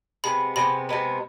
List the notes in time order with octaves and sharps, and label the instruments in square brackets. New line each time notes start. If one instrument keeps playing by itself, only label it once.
[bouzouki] C3 G#3 B3 [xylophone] B5
[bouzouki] C3 G#3 B3 [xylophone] B5
[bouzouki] C3 G#3 B3